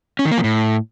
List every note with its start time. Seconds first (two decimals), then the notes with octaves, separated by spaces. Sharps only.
0.19 C#4
0.25 D#3
0.32 A#3
0.38 F3
0.44 A2